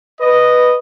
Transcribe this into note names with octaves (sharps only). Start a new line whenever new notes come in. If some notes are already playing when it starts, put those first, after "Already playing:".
B4 D#5